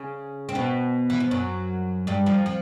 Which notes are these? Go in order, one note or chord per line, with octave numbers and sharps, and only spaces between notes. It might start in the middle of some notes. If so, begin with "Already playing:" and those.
Already playing: C#3 C#4
C4
B2 B3
E3
F3
F#2 F#3
G2 G3
F2 F3
F3